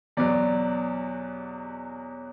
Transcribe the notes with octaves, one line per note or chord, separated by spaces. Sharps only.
E2 B2 F#3 D5